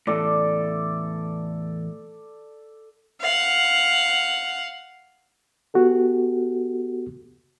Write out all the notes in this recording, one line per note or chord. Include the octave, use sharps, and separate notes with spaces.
E2 A2 A4 D5
F5 F#5
B3 F#4 G4 A4